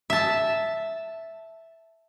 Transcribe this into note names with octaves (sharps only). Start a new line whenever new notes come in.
E5 A5